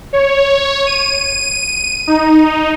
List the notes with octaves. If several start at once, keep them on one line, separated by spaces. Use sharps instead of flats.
C#5
D#7
D#4